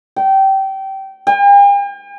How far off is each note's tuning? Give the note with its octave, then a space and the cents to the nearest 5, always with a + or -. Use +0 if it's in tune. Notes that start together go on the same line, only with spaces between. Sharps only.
G5 -20
G5 +45